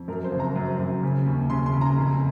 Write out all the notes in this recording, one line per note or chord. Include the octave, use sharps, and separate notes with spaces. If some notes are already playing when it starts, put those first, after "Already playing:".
Already playing: F2
F#2 A#4
C5
F#1
A#5
F#2
F#2
C#3
D#2
C#3 C6
C6
C#3
A#5
F1